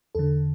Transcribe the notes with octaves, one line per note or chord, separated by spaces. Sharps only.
E2 D3 A4